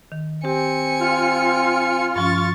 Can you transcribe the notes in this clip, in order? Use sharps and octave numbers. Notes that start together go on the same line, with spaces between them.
D#3
C4 G4 G#5 C#7
F4 F6
G2 F3 C#4 C#6 A6